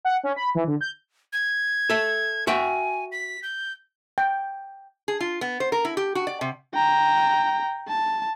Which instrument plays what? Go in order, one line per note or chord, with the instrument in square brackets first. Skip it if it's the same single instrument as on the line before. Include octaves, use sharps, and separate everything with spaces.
[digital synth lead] F#5
C#4
B5
E3
D3
G6
[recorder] G#6
[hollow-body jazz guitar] A4 E5
[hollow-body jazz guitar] F#4 E5 G5 [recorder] G#5
[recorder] B6
G6
[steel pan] G5
[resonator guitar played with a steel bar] G#4
F4
B3
C5
A#4
E4
G4
F#4
D5
C3
[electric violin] G5 A#5
A5